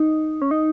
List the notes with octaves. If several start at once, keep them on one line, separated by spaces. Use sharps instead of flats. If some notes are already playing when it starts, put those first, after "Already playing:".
Already playing: D#4
C#4
D#4